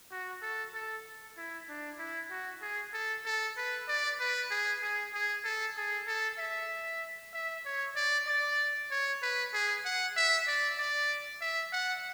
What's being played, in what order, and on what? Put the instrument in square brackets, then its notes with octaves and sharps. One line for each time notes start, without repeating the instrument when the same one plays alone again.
[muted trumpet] F#4
A4
A4
E4
D4
E4
F#4
G#4
A4
A4
B4
D5
B4
G#4
G#4
G#4
A4
G#4
A4
E5
E5
C#5
D5
D5
C#5
B4
G#4
F#5
E5
D5
D5
E5
F#5